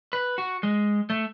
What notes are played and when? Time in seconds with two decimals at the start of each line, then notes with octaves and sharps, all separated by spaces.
0.13 B4
0.38 F#4
0.63 G#3
1.10 A3